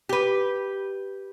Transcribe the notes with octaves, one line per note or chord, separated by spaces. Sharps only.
G4 B4